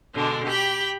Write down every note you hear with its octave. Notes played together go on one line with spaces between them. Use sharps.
B2 D3 G#3 D4
G4 G5 B5